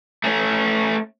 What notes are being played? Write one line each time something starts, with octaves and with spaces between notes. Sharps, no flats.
A3 C#4